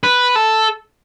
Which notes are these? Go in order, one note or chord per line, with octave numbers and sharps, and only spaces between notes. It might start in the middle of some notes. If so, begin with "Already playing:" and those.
B4
A4